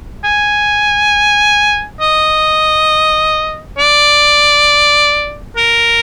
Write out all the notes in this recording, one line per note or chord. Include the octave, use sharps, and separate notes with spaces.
G#5
D#5
D5
A#4